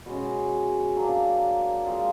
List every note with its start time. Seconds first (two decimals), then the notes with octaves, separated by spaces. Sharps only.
0.06 B2 G#3 C#4
0.96 F#3 A#3 D4
1.86 G#3 C4 F4